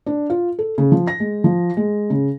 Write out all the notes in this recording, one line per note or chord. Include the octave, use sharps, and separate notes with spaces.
D4
F4
A4
C#3
F3
A#6
G#3
F3
G#3
C#3